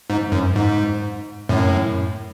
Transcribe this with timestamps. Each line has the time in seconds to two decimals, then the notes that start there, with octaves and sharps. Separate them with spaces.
0.10 G#2
0.32 F#2
0.56 G#2
1.49 F#2 A2